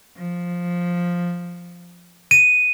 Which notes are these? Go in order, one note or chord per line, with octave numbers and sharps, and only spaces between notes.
F3
D#7